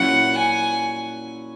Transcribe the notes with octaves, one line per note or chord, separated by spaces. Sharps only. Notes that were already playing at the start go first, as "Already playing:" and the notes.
Already playing: A#2 F#3 C#4 E4 F#5
G#5